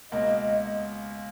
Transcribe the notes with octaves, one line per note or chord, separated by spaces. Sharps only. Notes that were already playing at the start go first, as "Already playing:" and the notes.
C#2 B2 A#3 D#5